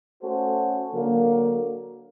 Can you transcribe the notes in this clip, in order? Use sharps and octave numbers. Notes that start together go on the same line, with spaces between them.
A3 C#4 F#4 A4 C5
D3 F#3 A#3